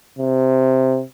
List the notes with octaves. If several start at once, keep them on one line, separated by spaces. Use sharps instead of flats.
C3